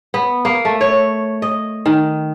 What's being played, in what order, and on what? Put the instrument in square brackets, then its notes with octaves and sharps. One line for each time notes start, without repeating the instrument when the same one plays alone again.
[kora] B3
A#3
A3
C#5
D#5
D#3